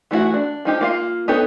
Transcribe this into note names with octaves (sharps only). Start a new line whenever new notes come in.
E3 A3 D4 E4 F#4
D4
F3 D#4 G4
A#3 F4 F5
B3 D#4 G4 A4 C#5